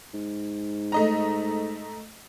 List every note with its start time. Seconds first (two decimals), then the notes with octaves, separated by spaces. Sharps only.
0.14 G#2
0.92 A3 D#5 A#5